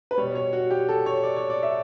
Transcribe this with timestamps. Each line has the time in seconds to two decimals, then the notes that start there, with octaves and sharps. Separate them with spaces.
0.11 B4
0.18 B2 G3 C#5
0.35 C#5
0.53 F#4
0.71 G4
0.89 A4
1.06 C#5
1.23 D5
1.36 C#5
1.50 D5
1.63 E5